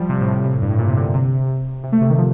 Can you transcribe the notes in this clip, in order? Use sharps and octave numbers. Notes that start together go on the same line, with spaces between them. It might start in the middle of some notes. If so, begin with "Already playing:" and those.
Already playing: F3 G3
C3
A2
A2
C3
A2
G2
A2
A#2
C3
D3
C3
C3
A3
C3
D#3
F3